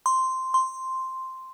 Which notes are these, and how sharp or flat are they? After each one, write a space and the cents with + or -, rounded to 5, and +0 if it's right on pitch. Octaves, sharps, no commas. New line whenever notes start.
C6 -5
C6 +0